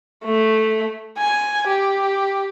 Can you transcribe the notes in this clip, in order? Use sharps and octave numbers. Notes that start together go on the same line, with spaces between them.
A3
G#5
G4